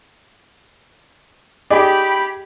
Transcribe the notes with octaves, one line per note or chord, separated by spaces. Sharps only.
D#4 G4 G#4 D5 G5 B5